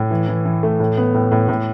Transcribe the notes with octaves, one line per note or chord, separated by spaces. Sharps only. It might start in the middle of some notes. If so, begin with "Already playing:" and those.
Already playing: A2
E3
E3
E3
A3
A2
B3
A2
A2
A2